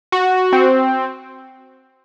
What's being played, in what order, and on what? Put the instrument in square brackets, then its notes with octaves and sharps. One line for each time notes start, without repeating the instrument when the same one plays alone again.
[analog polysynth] F#4
C4